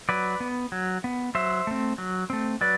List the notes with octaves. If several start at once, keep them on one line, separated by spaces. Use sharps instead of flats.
F#3 B4 D5
B3
F#3
B3
F#3 C5 E5
A3 C4
F#3
A3 C4
F#3 B4 D5